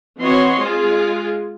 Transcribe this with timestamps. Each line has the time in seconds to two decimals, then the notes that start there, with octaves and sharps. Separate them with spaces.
0.20 E3 C4 F#4 C#5 D#5 C6
0.61 G#3 F4 G#4